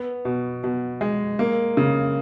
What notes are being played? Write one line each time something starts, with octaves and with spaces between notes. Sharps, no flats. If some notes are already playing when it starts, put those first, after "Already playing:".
Already playing: B3
B2
B2
G#3
A#3
C#3